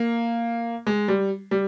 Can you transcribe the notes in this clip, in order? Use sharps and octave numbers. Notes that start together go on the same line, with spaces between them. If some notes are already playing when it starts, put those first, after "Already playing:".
Already playing: A#3
G#3
G3
G3